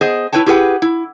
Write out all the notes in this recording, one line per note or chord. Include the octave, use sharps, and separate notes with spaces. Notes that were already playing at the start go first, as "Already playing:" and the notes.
B3 G#4 C5 D#5
E4 B4 C#5 G5 A5
E4 G4 G#4 B4 F#5 G5
E4